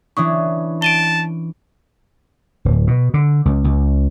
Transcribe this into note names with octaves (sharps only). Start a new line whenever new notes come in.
E3 C#4 D4 C#6 D#6
A5 D7 D#7 G7
D1
B2
D3
C#2
C#2